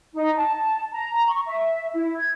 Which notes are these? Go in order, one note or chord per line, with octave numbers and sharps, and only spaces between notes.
D#4
A5
A#5
C#6
E5
E4
G#6